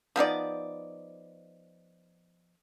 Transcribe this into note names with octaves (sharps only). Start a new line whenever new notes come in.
F3 B3 D#4 D5